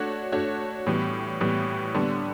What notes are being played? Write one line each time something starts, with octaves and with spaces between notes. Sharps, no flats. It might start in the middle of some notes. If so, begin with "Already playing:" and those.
Already playing: A3 D4 F#4 C#5
A3 D4 F#4 C#5
A2 E3 G3 B3
A2 E3 G3 B3
D3 G3 B3 D4